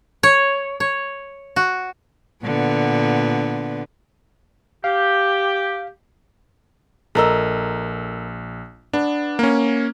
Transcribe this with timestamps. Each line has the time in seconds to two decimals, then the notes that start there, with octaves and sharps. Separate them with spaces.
0.23 C#5
0.80 C#5
1.56 F#4
2.44 A#2 D3 B3
4.84 G4 F5
7.15 A#1 A4 A#4 D#5 E6
8.93 B3 D4
9.39 A#3 C#4